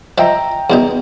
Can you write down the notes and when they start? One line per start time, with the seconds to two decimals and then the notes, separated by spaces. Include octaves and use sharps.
0.18 F3 D#5 E5 G5 A#5
0.70 E2 B2 D#4